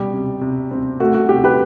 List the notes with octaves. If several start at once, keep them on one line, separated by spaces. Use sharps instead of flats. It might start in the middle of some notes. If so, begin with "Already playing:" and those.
Already playing: B2 G3 G4
C3
C3
C4
A3 F#4
F#4
C3 G4
G4 B4